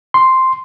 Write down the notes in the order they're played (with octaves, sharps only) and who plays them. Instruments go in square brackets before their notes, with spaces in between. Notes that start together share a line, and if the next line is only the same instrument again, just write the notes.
[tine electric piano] C6